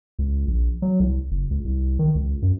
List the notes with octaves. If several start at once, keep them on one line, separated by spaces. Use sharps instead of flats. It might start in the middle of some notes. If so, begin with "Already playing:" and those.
C#2
A#1
F#3
C2
F#1
C#2
C2
D#3
C#2
F#2